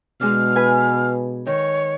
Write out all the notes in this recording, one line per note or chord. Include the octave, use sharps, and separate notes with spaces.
B2 G#3 D4 F6
B4 G#5
D#3 C#5